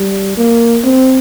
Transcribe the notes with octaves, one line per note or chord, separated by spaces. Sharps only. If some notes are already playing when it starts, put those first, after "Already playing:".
Already playing: G3
A#3
C4